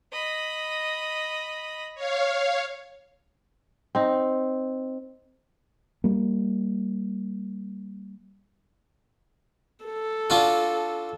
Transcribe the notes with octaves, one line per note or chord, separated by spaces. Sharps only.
D#5 B5
C#5 F5
C4 D#4
G3 A#3
A4
D4 F4 F#4